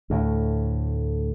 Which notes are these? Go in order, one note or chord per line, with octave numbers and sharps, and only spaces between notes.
D2 A2